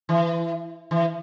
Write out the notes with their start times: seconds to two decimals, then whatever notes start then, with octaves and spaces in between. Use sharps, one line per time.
0.09 E3
0.91 E3